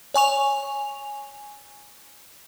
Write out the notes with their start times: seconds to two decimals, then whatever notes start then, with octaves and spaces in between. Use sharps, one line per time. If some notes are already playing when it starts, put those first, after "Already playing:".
0.14 C#5 G#5 C#6 F7